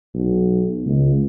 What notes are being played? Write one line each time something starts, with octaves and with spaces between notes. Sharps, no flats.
B1
C#2